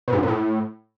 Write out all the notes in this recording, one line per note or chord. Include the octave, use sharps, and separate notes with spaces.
B2
G#2
F#2
A#2
A2